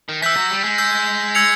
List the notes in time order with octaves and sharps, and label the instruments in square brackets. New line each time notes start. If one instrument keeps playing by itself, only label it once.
[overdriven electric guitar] D#3
[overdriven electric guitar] E3 [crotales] E6 G6 B6
[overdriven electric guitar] F#3
G3
G#3
[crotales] E6 G6 B6
E6 G#6 C#7 F7